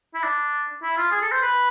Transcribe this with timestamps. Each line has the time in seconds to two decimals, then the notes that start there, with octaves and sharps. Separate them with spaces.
0.14 E4
0.24 D4
0.83 E4
0.97 F4
1.11 G#4
1.22 A4
1.32 C5
1.42 B4